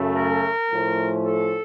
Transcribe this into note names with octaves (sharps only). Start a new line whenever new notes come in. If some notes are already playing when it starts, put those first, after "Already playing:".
Already playing: F#2 C#3 A3
A#4
A2 F3 A3 C#4
A4